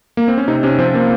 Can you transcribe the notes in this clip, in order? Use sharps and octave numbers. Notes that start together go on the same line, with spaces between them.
A#3
C4
C#4
C3 D#4
C3 C#4
F3 C4
A#3